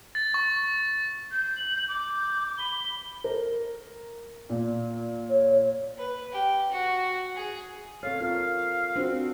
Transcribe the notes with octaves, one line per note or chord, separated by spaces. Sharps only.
A6
C#6
G6
F#7
D6 G6
B5 G7
A#4
A#2
C#5
B4
G4
F#4
G#4
C4 A4 C#5 F5
F4 A#4 F5
C4 D4 F#4